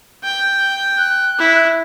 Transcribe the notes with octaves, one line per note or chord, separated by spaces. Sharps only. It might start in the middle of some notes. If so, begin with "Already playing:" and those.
G5
F#6
E4